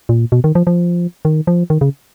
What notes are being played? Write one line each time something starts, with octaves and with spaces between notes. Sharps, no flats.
A#2
B2
D#3
F3
F3
D#3
F3
D#3
C#3